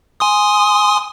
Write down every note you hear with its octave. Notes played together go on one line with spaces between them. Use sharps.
G#5 C6 D#6